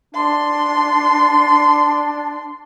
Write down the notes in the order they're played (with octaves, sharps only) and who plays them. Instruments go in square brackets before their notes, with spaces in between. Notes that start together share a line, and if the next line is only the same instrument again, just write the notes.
[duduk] D4 [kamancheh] C6